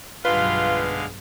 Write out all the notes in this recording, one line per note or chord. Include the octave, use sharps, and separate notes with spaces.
B1 G2 D3 G#3 F4 B4 F5